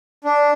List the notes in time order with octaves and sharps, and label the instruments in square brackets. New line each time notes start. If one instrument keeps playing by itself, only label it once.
[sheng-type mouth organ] D4